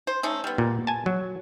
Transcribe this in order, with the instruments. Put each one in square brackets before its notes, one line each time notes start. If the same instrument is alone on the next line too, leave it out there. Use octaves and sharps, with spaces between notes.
[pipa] C5
A3 C#4 D#4
G3 B3
[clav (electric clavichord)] A#2
G#5 A5
F#3